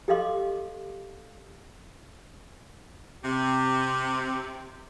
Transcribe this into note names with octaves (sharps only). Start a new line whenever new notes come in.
G4 A4 D#5 F5 C6 D6
C3 G4